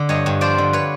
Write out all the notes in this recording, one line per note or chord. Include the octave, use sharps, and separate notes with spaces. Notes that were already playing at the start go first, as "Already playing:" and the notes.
Already playing: D3
G2 C#5 D#5
G2
F3 C5 D5
D3
B4 C#5